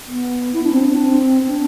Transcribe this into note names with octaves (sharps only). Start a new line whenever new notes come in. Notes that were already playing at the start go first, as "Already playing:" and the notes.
B3
E4
D4
C4
D4
C4
D4